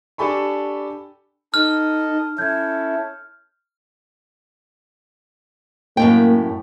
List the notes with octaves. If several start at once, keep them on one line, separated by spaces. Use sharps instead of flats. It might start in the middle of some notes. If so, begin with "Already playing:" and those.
D4 G4 A4 G#5 B5 C#6
D#4 A4 D#5 F6
C#4 E4 A4 E5 G6 G#6
F#2 A2 A#3 G5